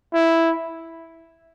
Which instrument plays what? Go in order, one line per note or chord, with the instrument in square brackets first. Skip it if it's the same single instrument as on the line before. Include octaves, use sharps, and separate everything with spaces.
[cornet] E4